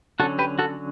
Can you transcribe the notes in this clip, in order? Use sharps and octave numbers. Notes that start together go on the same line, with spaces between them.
D3 F#3 C#4 F#4 A4
G4 B4
F#4 A4